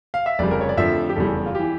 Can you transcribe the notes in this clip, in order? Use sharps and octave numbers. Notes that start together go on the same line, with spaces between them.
F5
E5
F1 F2 C#3 G3 D5
A#4
C#5
D5
F2 D3 F3 A3 E5
G4
F1 E2 C#3 G3 A4
F4
E3 G4